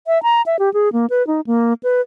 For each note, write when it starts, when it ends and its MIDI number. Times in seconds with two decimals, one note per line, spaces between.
0.07 0.21 76
0.23 0.42 82
0.46 0.57 76
0.59 0.72 67
0.74 0.92 68
0.93 1.06 58
1.10 1.25 71
1.27 1.41 63
1.47 1.74 58
1.83 2.01 71